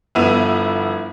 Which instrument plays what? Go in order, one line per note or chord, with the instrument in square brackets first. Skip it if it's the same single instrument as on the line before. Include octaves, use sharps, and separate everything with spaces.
[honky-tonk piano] G1 F3 B3 E4 D#7 F7